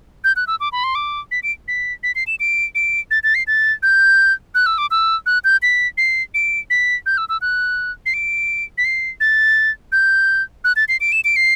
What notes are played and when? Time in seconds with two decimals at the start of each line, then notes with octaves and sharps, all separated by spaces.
0.24 G6
0.36 F#6
0.47 E6
0.60 D6
0.72 B5
0.84 C6
0.95 D6
1.31 B6
1.43 D7
1.68 B6
2.03 B6
2.15 C7
2.27 E7
2.40 D7
2.75 D7
3.11 A6
3.23 A6
3.35 C7
3.47 A6
3.83 G6
4.55 F#6
4.66 E6
4.78 D6
4.91 E6
5.26 F#6
5.44 G6
5.62 B6
5.98 C7
6.34 D7
6.70 B6
7.06 G6
7.18 E6
7.29 E6
7.41 F#6
8.06 C7
8.14 D7
8.78 B6
8.85 C7
9.20 A6
9.92 G6
10.64 F#6
10.76 A6
10.88 C7
11.01 D7
11.12 E7
11.25 D7
11.36 C7